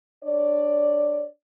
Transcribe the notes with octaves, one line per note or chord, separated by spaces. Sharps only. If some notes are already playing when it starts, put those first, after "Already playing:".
D4 C#5 D5